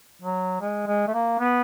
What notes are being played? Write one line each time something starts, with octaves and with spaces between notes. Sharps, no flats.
F#3
G#3
G#3
A3
A#3
B3